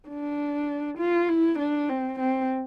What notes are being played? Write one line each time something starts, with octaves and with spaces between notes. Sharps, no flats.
D4
F4
E4
D4
C4
C4